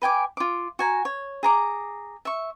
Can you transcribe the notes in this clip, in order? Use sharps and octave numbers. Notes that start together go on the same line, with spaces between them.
B4 G5 G#5 D6
F4 D6
F#4 G#5 A#5
C#5
G#4 A#5 D6
E5 C#6